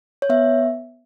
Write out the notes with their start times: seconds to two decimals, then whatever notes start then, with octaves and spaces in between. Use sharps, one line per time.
0.22 C#5
0.29 B3 E5